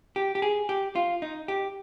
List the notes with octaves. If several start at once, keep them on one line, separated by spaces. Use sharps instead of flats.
G4
G4
G#4
G4
F4
D#4
G4